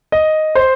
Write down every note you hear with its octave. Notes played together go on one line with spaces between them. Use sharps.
D#5
C5